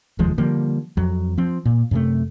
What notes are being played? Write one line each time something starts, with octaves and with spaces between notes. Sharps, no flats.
F1 D#2 F3 G#3
D3 F3 G3 A#3
F2 F#3
F3 C4
A#2
F#2 C3 A3